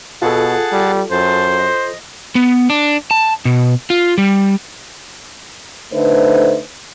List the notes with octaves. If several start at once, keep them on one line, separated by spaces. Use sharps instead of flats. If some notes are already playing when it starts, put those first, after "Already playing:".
B2 F4 G#4 A4 F#5 A5
G3
F#2 C5 A5
D#5
B3
D4
A5
B2
F4
G3
D3 A3 D#4 B4 C5